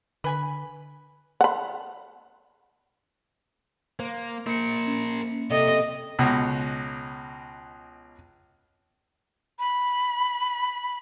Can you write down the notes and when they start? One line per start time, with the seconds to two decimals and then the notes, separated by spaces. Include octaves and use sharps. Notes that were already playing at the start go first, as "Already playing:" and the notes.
0.24 D3 B4 G#5 B5
1.41 F#5 B5
3.99 A#3 C5
4.47 A#3 A#4 C5 C#7
4.86 C#4
5.51 C3 A4 D#5
6.19 C#2 B2
9.59 B5